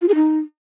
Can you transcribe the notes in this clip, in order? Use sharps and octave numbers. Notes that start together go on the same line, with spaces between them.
F4
G#4
D#4